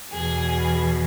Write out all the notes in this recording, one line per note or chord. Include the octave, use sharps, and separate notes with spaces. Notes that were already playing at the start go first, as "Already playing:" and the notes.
E2 B2 G#4